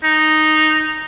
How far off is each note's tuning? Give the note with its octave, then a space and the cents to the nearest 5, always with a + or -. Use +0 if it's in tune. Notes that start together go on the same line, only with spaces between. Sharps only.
D#4 -5